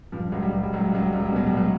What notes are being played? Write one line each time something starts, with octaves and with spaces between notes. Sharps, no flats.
G2 F3
C#2 F#3
G3
C#2 F#3
G3
C#2 F#3
G3
C#2 F#3
G3
C#2 F#3
G3
B2 F#3
G3
C#2 F#3